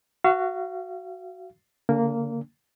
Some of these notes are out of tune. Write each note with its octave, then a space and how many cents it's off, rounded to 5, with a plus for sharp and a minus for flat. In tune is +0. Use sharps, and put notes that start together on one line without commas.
F#4 +5 F5 -35
D3 -45 A#3 -10 D4 -40